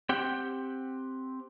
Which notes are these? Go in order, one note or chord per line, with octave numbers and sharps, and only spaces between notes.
C4 G4 F#5 G5